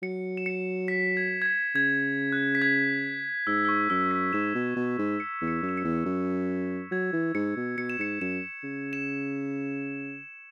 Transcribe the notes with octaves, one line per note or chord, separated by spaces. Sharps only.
F#3 C#7
E7
C#7
B6
G#6
G#6
B6
C#3 G#6
F#6
B6
G#6
G#2 E6
E6
C#6
F#2 E6
B6
G#2 E7
B2
B2
G#2
C#7
E2
C#7
F#2
E7
C#7
E2
F#2
F#3 G#6
E3
G#2 C#7
B2
B2 C#7
E7
G#2 C#7
F#2 E7
C#3
E7